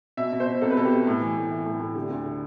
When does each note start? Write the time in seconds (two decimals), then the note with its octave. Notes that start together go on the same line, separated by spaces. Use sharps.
0.17 B2 E5
0.32 B2
0.40 C5
0.47 B2
0.61 C2 A4
0.70 B4
0.77 B2 A4
0.85 G4
0.92 B2
1.07 A2
1.21 E3
1.36 A2
1.51 E3
1.66 A2
1.80 A2
1.95 D3 G4
2.10 D2
2.25 D3